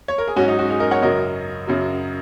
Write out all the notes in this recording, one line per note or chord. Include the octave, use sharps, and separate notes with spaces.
C#5
A#4
G#4
G#2 F#3 C#4 F#4
D#4
C#4 F#4
D#4 G#4
A#4 D#5
C#5 F#5
F#2 C#3 F#3 A#4 D#5
F#2 C#3 F#3